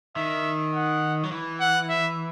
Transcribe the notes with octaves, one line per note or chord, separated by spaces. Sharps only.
D#3 E5
F#5
F#3
E3
F#5
E5